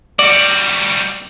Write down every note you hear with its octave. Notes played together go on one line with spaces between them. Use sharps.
G3 F#4 D5